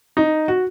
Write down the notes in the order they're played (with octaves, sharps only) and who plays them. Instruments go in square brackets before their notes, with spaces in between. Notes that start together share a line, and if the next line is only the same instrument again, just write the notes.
[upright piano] D#4
F#4